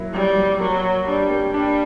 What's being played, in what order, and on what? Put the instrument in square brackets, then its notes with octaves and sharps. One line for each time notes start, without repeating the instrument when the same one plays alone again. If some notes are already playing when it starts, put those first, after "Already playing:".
Already playing: [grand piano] F#3 A#3 E4
[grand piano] F#3 [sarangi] G3
[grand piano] F#3
[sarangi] F#3 [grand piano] A#3
[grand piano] C#5
[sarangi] G3 [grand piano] D4
[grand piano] A#3
[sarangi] G3 [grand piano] D4